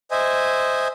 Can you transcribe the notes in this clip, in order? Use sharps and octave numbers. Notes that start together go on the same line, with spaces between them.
C5 D#5 E5 G#5